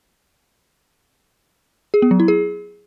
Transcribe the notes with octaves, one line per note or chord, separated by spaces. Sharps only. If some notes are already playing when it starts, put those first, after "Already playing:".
G#4
B3
F#3
E4
G#4